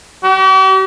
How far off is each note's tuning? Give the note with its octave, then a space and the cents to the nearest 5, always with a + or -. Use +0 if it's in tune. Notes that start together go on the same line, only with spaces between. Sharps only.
G4 -45